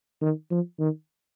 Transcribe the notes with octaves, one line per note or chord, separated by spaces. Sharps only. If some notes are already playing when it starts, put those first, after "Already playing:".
D#3
F3
D#3